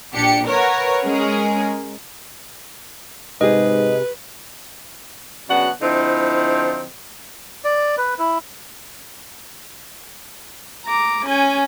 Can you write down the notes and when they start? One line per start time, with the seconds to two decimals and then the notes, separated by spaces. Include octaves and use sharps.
0.14 A#1 D4 G4 C#7
0.47 A#4 B4 C#5 F#5
1.04 G#3 C#4 G#4 A#4
3.41 G#2 C3 G4 G#4 B4 D#5
5.49 F#2 C#3 B3 D4 F#4 F#5
5.81 D3 F3 C4 D#4 E4
7.64 D5
7.97 B4
8.19 E4
10.86 A#5 D6
11.26 C#4 G#5